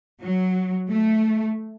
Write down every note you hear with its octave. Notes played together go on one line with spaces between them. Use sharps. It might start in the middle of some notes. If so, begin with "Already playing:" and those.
F#3
A3